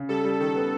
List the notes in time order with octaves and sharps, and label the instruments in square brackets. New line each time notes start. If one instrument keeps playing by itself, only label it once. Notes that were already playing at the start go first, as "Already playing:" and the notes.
Already playing: [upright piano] C#3
[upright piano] G3 [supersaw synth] A4
[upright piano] G3
[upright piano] D#3 [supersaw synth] A4
[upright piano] B3